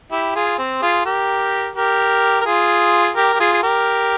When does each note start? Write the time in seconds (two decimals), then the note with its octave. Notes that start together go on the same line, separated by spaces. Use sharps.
0.11 E4 G4
0.35 F4 G#4
0.58 C4
0.82 F4 G#4
1.05 G4 A#4
1.76 G4 A#4
2.41 A#4
2.46 F4 G#4
3.16 G4 A#4
3.34 G4
3.40 F4 G#4
3.53 G#4
3.63 G4 A#4